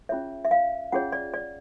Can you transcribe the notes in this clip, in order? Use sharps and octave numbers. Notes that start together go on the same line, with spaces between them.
C#4 F4 G#4 C#5 E5
E5
F5
C#4 F4 G#4 C#5 F#5
D5
D5